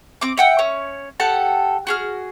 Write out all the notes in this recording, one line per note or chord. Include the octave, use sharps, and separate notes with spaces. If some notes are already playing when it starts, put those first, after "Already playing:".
C4 D6
E5 F#5 G5
C#4 C#5
G4 A4 F#5 A5
F#4 G#4 F6